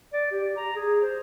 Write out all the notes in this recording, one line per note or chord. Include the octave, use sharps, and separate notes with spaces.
D5
G4
A#5
G#4
C5